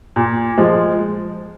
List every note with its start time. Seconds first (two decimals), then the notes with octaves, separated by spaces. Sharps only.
0.16 A#2
0.58 F3 G#3